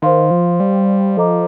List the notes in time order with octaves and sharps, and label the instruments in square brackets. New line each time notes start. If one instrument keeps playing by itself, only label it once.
[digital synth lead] D#3 [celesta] C5 F5 C6
[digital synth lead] F3
G3
[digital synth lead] F3 [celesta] A4 D#5 A#5 D6